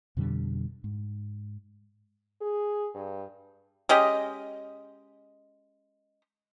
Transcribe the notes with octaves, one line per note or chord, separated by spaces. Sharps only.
F2 B2 D3 G3
G#2
G#4
G2
G#3 C#4 G4 D#5